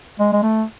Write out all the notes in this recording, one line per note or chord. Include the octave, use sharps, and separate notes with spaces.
G#3
G#3
A3